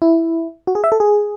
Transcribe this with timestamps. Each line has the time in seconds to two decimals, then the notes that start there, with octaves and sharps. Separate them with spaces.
0.02 E4
0.67 F#4
0.75 G#4
0.84 E5
0.92 A4
1.00 G#4